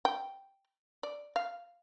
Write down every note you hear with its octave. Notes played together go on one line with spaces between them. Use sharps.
G5
D5
F5